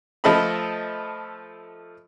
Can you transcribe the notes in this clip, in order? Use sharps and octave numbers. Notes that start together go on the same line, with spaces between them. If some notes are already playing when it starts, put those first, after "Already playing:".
F3 A3 A4 D#5 E5 B5